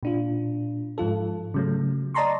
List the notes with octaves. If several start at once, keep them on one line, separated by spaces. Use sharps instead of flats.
A#2 D4 F4
G#2 F3 F4 A4
C#3 F#3 A3
D5 D#5 A5 A#5 C6 C#6